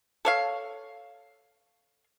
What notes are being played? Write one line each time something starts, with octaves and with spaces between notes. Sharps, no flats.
A4 C#5 F5